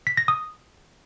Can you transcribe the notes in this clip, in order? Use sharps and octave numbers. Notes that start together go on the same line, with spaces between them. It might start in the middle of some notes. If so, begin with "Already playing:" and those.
B6
A#6
D#6